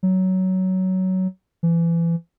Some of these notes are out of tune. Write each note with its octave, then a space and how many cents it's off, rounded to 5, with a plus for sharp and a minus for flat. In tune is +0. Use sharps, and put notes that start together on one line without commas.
F#3 +15
E3 +30